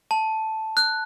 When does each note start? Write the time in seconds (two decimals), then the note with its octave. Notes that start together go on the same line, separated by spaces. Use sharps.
0.11 A5
0.77 F#6